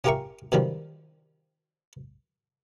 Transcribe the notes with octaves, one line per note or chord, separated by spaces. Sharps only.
C#4 F4 G4 A#4 E5 C#6
B2 D#3 F3 G3